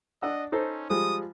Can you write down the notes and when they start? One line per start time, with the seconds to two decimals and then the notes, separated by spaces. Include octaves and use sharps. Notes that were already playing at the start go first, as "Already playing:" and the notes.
0.22 D4 D#5 F#5 E6
0.52 C#4 D#4 A4 C5
0.90 F3 G3 G#3 D#6